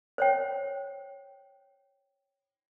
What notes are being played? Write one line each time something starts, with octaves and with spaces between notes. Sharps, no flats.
C5 C#5 G5